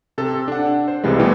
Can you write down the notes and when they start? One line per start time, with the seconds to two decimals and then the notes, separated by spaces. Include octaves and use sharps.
0.18 C3 A4
0.48 D4 F#5
0.88 C5
1.04 C2 C3 E3 G3 G#3
1.20 B2 E3 G3 A3 B3 C4